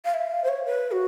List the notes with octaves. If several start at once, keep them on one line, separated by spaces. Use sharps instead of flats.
F5
E5
F5
C5
C#5
B4
F#4